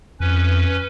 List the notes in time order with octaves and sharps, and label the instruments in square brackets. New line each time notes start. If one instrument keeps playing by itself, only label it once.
[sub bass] F2 [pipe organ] C#4 B4